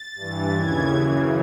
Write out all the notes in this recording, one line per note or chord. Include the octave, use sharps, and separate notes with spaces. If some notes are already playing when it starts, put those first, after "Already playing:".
Already playing: A6
G2 E3
D#2 C#3 E3 G#6
F#2 C#3 E3